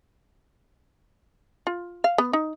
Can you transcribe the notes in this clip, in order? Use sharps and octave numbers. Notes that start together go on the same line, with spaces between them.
F4
F5
B3
D#4